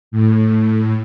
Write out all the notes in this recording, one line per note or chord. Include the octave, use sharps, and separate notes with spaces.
A2